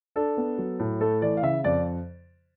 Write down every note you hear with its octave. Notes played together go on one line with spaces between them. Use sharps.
D4 A4
B3
F#3
A2
A3 A4
E3 D5
F5
C#3 E5
F2 D5